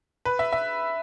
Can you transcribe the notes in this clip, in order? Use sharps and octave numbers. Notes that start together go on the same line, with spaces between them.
B4
E5
E5